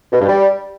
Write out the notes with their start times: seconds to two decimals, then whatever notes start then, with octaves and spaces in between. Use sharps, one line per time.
0.13 B2
0.20 G2
0.28 G3